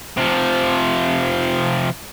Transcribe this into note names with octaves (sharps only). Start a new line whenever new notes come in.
C3 F3